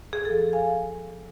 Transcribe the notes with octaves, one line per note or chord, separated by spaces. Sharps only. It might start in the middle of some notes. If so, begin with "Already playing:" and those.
F2 G#4
A4
F3
F5 G#5